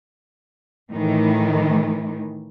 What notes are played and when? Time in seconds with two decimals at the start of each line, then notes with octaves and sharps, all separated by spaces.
0.91 A2 D#3 E3